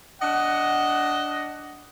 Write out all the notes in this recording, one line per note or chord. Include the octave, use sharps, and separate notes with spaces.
D4 D#5 F#5